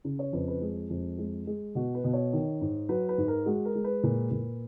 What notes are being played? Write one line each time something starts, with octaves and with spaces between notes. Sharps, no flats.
C#3
C#5
F2 B4
B4
G#3 G#4
F2
G#3
G#3
B2 F#4
B4
B2
C#5
D#3
G#2
F#3 B4
B4
G#2
A#4
G#3 F#4
A#4
G#3
B4
A#2
A#2